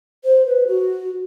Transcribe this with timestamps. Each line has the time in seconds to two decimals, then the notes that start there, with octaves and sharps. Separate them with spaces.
0.24 C5
0.46 B4
0.67 F#4